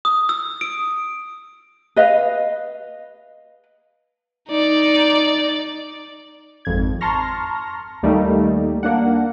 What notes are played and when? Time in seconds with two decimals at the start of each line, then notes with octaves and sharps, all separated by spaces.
0.05 D#6
0.29 E6
0.61 D7
1.96 B4 D#5 F5
4.49 D#4 D5
6.65 G#1 F2 G#6
7.01 A5 A#5 C6 C#6 F6 A#6
8.03 D#2 G3 A3 A#3 D#4
8.83 A#3 D4 F#5